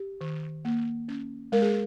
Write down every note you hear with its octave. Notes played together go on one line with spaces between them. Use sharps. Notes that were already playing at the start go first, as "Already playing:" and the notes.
Already playing: G4
D#3
A#3
C#4
G#3 A#4
G#4